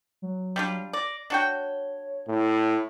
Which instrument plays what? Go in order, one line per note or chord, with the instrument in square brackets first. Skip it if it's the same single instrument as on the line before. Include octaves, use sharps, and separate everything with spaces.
[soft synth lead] F#3
[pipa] G3 D4 F4
[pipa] D5 [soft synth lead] A#6
[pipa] D4 F#4 G5 [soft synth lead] C#5
[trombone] A2